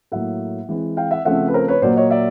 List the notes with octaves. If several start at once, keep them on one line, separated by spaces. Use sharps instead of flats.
A2 F#3 A#3 E5 F#5
E3 G#3 C4
F5 G5
E5 F#5
C#3 F3 A3 C4 E5 F#5
B4
A#4 C5
B4 C#5
A#2 F#3 A#3 C5 D5
C#5 D#5
D5 E5